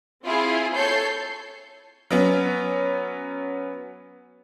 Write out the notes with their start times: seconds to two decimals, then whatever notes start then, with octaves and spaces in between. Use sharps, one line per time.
0.25 C4 E4 F4 G#4
0.75 A4 C#5 G6 C7
2.11 F#3 B3 C#4